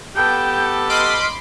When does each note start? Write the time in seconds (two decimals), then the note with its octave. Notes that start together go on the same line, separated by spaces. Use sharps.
0.15 B3 G4 A4 G5 G6
0.90 D#5 B5 C6 D6 F6